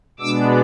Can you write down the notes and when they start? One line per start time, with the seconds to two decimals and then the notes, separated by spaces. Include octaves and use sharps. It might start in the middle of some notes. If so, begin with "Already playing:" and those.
0.19 B2 G#3 B3 D4 D6 E6